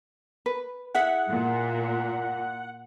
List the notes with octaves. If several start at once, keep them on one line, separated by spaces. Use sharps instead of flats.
B4
E4 G#4 E5 F#5
A#2